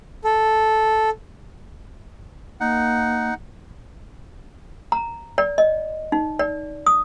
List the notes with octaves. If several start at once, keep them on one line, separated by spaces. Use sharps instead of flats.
A4
A#3 D#4 F#5
A#5
D5
D#5
D#4
D5
D#6